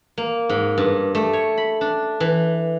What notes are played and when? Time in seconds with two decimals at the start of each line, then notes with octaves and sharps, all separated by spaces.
0.18 A#3
0.49 G#2
0.78 G2
1.15 A3
1.33 C#5
1.58 B5
1.81 D4
2.20 E3